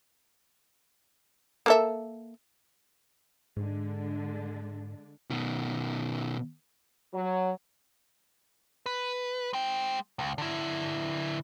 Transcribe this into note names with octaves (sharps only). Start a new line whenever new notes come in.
A#3 A4 E5
G#2 D3 G#3 D4
B2 D#3
F#3
B4
G#3 G5
C#2
D3 E4